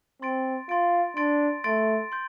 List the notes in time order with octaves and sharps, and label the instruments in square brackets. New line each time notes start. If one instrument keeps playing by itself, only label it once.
[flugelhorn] C4 [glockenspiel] C6 A6 D7
[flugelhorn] F4 [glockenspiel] C6 A6 D7
[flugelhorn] D4 [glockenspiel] C6 A6 D7
[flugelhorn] A3 [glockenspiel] C6 A6 D7
[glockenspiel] C6 G6